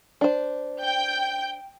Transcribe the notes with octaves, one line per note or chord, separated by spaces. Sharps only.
D4 C5
G5 G6